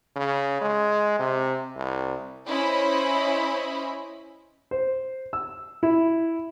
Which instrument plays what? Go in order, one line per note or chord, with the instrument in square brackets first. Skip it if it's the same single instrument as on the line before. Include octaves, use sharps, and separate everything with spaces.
[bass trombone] C#3
G#3
C3
C2
[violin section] C#4 E4 C5 D#5 B5
[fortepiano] C5
E6
E4